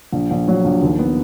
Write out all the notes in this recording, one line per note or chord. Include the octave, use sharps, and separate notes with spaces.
A#1
A#1
F#3
A#1
D#2
B3